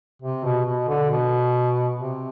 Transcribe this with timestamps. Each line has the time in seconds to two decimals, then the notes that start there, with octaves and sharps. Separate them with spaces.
0.22 C3
0.44 B2
0.65 B2
0.88 D3
1.10 B2
1.98 C3